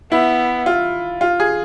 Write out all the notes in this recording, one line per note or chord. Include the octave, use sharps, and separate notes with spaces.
B3 E4
F4
F4
G#4